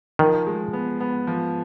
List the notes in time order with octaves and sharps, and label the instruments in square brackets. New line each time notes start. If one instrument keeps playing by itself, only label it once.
[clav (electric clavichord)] D#3 [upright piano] F3
[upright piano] G#3
B3
B3
F3